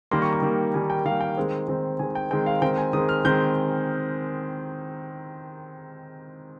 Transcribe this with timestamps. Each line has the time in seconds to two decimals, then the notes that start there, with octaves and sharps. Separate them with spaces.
0.11 D#3 G3 A#3 C6
0.22 C#6
0.33 C#6
0.42 D#3 G3 A#3
0.74 D#3 G3 A#3 G#5
0.90 G5
1.05 D#3 G3 A#3 F5
1.21 G5
1.37 D#3 G#3 C4
1.68 D#3 G#3 C4
1.99 D#3 G#3 C4 G#5
2.15 G5
2.31 D#3 G#3 C4 G5
2.46 F5
2.62 D#3 G#3 C4 G5
2.78 G#5
2.93 D#3 G#3 C4 D#6
3.09 F6
3.25 D#3 G#3 C4 G6